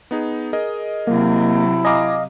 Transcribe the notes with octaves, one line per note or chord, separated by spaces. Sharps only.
B3 D#4 G#4
G#4 A#4 D#5
C3 F#3 A#3 E4
D#5 F5 G#5 A#5 D6